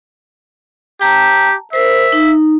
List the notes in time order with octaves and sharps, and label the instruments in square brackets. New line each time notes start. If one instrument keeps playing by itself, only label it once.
[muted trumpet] G4 [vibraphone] G5 A5 A#5
[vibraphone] A#4 C5 [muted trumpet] E5
[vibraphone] D#4